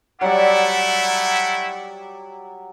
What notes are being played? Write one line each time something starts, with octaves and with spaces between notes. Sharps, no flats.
F#3 G3 A3 E4 D5 F#5